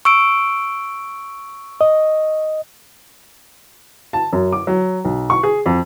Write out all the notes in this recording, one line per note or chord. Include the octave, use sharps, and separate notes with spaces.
C#6 E6 D7
D#5
A5
F#2
D6
F#3
B1
C#6
G#4
F2